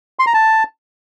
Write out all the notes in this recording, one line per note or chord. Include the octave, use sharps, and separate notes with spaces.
C6
A#5
A5